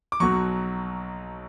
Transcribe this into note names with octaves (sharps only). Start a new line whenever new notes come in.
D6
B1 B2 F#3 C#6